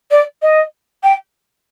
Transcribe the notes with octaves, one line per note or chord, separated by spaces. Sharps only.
D5
D#5
G5